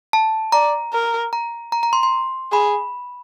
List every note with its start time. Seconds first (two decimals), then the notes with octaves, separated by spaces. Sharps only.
0.13 A5
0.52 D5 A#5
0.93 A#4
1.33 A#5
1.72 A#5
1.83 A#5
1.93 C6
2.03 C6
2.52 G#4 B5